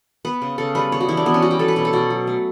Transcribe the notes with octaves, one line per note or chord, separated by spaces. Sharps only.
B3 B4
C#3
C#3 A4
G3 B4
B3 C#5
F#4
E3 E4
D4
E3 B3
C#4
G3 F#4
G4
B3 A4
B4
B2 C#5
A4
B2 F#4
F#3
A3